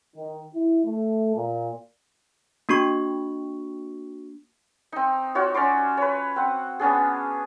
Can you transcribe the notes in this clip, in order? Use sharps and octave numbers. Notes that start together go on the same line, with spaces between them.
D#3
E4
A3
A#2
A#3 D4 F#4 C#6
C4 D#4
D#4 F4 F#4 C#5
C#4 D5 C6 D6
B4 C#5
C4 F#5
B3 C#4 D4 G#4